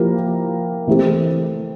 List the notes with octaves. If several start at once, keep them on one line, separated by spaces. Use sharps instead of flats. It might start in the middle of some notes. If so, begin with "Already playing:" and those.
Already playing: F3 A#3 E4 G4 A#4
E3 A3 C4 G4